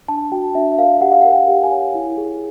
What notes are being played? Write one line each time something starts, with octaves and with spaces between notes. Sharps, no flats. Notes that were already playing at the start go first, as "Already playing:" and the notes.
D4 A5
F#4 G5
D4 E5
E5
A#4 F5
G4 F#5
F5
F#5
A#4
G5
G4
G#5
C#5
E4
G#4